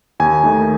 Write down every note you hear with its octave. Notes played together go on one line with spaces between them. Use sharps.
D#2 G#5
D#3 A3 D#4